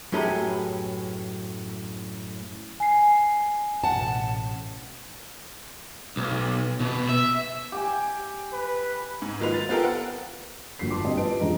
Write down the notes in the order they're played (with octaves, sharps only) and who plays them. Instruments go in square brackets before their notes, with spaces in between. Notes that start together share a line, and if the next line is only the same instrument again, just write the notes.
[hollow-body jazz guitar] F#2 A2 G4 G#4 B4 A#5
[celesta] G#5 C7
[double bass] A1 B2 [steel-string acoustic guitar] F#5 A5
[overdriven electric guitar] B1
B2
E5
[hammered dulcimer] G4 G5 G#5
[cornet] B4
[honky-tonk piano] G#2
D#3 F#3 G#3 F4 B4 F7
A6
B3 C4 F4 G4 A4 A#4
F#5
[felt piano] G1 A#3 F#4 B6 C7
A5 C6 D6
G2 C4 D#5
F3 F4 B4 A5 D7
E1 G2 G#3 C#4 F4 A#5